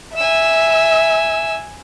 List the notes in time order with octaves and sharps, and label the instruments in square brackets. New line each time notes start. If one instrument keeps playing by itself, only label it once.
[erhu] E5 [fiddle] G#5 E6